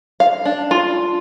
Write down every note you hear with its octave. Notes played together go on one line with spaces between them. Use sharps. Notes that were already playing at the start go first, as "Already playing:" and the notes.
F5
D4
F4